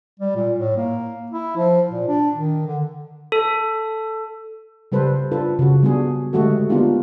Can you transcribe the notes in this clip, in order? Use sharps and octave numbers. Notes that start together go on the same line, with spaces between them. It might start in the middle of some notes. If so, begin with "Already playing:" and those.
G3
A#2
A2
A#3
E4
F3
A#2
D4
D#3
D3
A4
C#3 G3 A4 B4 C5
D4 F4 A4 B4
C#3 F#4
G3 B3 D4 F#4 G#4
D3 G#3 A3 F#4 G4 A4
A#3 B3 D4 D#4 F4 G4